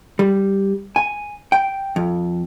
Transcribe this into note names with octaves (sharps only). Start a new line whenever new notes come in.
G3
G#5
G5
F2